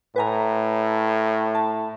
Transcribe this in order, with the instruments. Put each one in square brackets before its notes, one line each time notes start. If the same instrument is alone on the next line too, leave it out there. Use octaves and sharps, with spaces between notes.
[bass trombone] A2 [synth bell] B4 G#5 A#5
[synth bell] A5